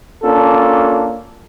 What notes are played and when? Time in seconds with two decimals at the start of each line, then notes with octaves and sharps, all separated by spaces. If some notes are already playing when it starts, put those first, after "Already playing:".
0.24 A#3 C#4 D4 F4 A4